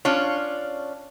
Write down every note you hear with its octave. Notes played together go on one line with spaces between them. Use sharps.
C#4 D4 F4 C#5